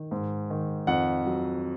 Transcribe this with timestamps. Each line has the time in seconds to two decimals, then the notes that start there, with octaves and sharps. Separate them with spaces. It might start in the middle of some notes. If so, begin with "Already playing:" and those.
Already playing: D#3
0.11 G#2
0.50 D#3
0.87 F2 F#5
1.26 F#3